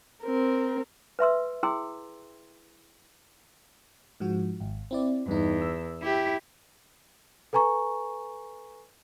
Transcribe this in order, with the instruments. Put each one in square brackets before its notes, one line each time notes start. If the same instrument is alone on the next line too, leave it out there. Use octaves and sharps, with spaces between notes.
[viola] C4 A#4
[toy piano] B4 E5 C6 E6
E4 G#4 G5 C6 E6
[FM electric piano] G#2 F3 F#4
G#1
C4 E4 D5
[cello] E2 [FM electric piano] G2 D#4
[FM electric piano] E6
[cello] E4 G4
[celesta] A4 B4 G#5 A#5 C#6